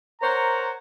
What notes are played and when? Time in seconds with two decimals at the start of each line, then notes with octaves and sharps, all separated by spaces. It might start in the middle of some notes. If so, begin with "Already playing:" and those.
0.21 A#4 C5 C#5 F#5 A#5